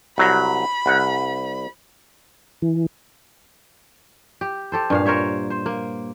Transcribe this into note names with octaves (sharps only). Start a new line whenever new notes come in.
C2 F#3 A#5 B5
C2 F#5
E3
G4
G4 A4 C5
G2 A#2 F5
A#4 C5 C#5 E5
C5
A#3